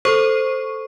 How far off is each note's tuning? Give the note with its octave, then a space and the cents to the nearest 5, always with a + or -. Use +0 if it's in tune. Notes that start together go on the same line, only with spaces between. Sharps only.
A4 +5 C5 +0 C#6 +0